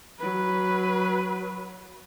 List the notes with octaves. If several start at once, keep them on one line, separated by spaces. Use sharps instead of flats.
F#3 B4